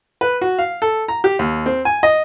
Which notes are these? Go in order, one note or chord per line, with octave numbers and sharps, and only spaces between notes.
B4
F#4
F5
A4
A#5
G4
D#2
C4
G#5
D#5